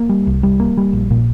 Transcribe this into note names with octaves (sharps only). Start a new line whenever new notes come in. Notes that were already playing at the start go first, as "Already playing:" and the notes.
Already playing: A#3
G3
C2
G3
A#3
G3
A#1
A#2